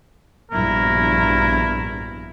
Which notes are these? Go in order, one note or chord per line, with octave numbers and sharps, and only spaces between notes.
A#1 G2 B2 E4 A#4